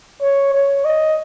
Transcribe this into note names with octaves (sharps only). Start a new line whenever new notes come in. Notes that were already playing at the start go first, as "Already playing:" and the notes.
C#5
C#5
D#5